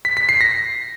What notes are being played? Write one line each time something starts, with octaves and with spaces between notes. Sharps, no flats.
B6
B6
C7
A#6